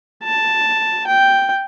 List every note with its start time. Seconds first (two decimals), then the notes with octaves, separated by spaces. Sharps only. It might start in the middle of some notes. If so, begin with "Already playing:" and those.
0.23 A5
1.07 G5